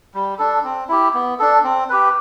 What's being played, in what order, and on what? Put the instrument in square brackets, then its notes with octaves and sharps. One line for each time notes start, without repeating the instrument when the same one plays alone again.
[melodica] G3
D4 A4
C4
E4 G4
B3
D4 A4
C4
G4 B4